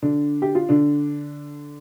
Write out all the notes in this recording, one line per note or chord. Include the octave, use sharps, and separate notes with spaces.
D3 D4
G4
F4
D3 D4